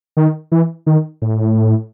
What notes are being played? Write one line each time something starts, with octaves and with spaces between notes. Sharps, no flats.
D#3
E3
D#3
A2